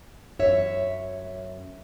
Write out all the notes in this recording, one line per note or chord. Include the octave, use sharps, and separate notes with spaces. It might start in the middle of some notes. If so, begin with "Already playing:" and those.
F#2 C#5 E5